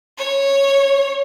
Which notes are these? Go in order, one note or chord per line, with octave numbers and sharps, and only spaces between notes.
C#5